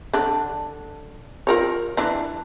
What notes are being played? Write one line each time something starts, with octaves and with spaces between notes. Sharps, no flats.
D3 D4
F4 A#4 C#5
E3 D4